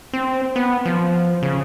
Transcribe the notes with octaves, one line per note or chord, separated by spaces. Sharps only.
C4
B3
F3
C#3